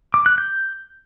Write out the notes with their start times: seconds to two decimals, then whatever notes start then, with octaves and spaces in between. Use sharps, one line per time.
0.14 D6
0.26 F#6
0.38 G6